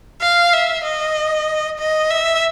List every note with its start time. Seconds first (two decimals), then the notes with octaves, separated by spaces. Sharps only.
0.21 F5
0.53 E5
0.84 D#5
1.79 D#5
2.10 E5